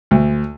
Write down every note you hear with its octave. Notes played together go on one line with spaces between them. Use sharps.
D2